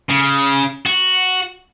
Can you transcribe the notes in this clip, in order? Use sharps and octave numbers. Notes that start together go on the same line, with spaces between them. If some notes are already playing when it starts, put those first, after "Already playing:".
C#3
F#4